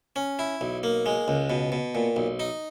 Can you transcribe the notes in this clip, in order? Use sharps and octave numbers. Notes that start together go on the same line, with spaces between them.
C#4
E4
B1
A#3
G#3
C#2
B2
B2
A#2
B1
D#4